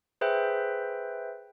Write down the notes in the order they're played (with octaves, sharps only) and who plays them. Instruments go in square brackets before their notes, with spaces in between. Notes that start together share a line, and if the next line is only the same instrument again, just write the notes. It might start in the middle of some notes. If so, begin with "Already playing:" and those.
[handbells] G#4 B4 C5 E5 G5